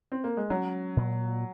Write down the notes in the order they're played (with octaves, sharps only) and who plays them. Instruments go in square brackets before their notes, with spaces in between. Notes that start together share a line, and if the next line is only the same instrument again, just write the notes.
[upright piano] C4
A#3
G#3
[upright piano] F#3 [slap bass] C#4
[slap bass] A#2